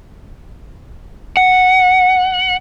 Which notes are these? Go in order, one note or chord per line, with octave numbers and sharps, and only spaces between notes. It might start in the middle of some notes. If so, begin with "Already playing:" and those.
F#5